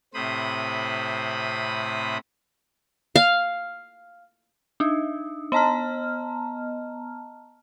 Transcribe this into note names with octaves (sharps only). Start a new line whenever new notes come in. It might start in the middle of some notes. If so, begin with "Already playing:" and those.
A2 C3 C5 B5 D#6
F5
D4 D#4
B3 D#5 A5 A#5 F6